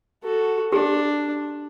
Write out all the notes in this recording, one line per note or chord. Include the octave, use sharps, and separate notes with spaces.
F#4 A4
D4 G4